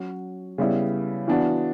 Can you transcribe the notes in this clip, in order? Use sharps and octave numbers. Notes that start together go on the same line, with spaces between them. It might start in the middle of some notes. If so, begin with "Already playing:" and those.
Already playing: F#3 C#4 F#4
C#3 G3 B3 E4
E3 B3 D4 F#4